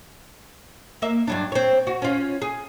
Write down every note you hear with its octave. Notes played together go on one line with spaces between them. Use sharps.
A#3 E5
G2 F#3 D4
C4 C#5
F#4
C#4 F4
G#4